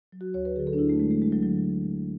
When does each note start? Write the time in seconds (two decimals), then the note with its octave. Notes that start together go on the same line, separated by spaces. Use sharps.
0.12 F#3
0.21 F#4
0.34 D2 C#5
0.45 B4
0.56 D3 F#3 G#4
0.67 A4
0.73 D4
0.78 D2 E4
0.89 A3
1.00 D3 F#3 G#3
1.11 A3
1.21 D2 G#3
1.32 F#3
1.43 D3 F#3